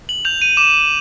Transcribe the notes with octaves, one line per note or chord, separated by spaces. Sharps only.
F#7
G6 F7
D#7
D6 E7